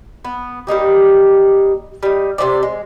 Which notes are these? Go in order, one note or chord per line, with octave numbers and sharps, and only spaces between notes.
B3
G3 A#3 D#4 G4
G3 D#4
C3 G3 C5 D5
G#3